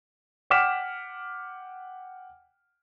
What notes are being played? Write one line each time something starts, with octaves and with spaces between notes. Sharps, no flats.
F#5 G5 D6 F6 B6 E7